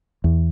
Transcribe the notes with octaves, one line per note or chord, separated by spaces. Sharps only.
E2